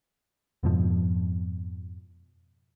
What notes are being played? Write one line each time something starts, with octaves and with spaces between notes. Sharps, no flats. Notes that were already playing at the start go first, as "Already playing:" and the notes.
F2 G#2 B2 F3